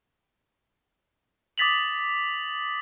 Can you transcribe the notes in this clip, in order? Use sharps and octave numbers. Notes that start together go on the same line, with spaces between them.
D6 D#6 A6 B6 F7 F#7